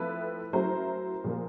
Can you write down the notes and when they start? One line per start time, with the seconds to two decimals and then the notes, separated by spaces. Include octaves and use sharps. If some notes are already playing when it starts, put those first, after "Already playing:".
Already playing: F3 A3 C4 E4 A4 B4
0.53 F#3 A3 C#4 E4 A#4 C5
1.24 A#2 F3 A#3